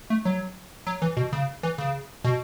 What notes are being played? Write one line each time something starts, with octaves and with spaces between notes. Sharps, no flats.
A3
F#3
F#3
E3
B2
C#3
E3
C#3
B2